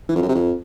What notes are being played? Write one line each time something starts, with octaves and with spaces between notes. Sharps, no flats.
E3
F2
F#2
C3
F2